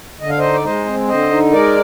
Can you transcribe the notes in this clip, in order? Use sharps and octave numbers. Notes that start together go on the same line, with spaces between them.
D3 D#5
F5
D#4 C5 D#5
D5
G#3 C5 D#5
C4
D3 C5 D#5
D#4
G#3 A#4 D5